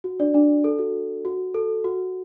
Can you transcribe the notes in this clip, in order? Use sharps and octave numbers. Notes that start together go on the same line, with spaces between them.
F#4
D4 D5
D4 D5
A4
F#4
F#4
A4
F#4